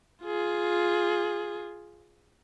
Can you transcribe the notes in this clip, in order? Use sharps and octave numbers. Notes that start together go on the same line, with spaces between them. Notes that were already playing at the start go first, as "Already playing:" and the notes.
F4 G#4